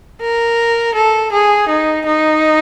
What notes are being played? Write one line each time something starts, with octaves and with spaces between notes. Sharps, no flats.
A#4
A4
G#4
D#4
D#4